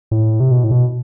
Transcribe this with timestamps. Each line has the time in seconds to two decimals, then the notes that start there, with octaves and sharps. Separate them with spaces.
0.11 A2
0.40 C3
0.51 B2
0.64 A2
0.71 B2